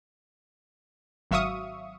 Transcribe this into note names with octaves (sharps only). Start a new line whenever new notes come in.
G#1 F#3 E5 F5 C#6 D#6